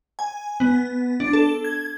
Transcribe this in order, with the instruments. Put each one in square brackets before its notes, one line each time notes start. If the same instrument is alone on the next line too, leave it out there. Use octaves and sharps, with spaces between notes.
[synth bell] G#5
B3
D4
A4
G#6